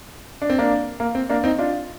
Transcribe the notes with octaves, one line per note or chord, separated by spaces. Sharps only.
D4
C4
A#3 D4
A#3
C4
A#3 D4
C4 D#4
D4 F4